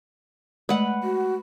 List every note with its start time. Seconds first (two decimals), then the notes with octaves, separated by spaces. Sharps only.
0.69 G#3 A3 B4 F#5
1.03 F#4